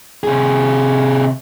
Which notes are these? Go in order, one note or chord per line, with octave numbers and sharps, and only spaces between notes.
C3 G#4